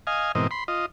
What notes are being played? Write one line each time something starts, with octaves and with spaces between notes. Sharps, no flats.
D#5 F5 G#5
G#2 B2 E3 C4 A#4 D#5
B5 C6
F4 D#5